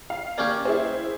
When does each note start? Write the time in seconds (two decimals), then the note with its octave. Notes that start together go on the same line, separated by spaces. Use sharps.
0.10 F5
0.38 A#3 C#4 G4 D5
0.65 E4 G#4 C5